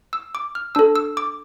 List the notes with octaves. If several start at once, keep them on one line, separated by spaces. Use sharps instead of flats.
E6
D6
F6
D4 A4 E6
E6
D6